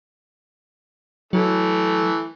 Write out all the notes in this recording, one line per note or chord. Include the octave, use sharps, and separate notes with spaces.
E3 F#3 A3